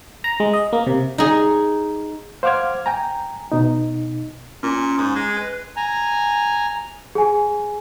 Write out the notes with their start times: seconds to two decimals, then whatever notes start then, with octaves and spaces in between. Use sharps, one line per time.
0.24 A#5
0.40 G#3
0.54 D#5
0.73 A#3
0.87 C3
1.18 D#4 G#4
2.43 C5 F5 F#5 D6 F6 G#6
2.86 G5 G#5 A#5
3.52 B2 D#4
4.63 A#2 C#4
4.98 G#2
5.16 G#3
5.37 B4
5.76 G#5 A#5
7.15 G#4 G#5